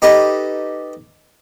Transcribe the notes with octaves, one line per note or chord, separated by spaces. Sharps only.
D#4 G4 A4 B4 D#5